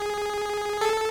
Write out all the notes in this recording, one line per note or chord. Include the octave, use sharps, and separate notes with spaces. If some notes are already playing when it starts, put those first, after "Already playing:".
Already playing: G#4
A4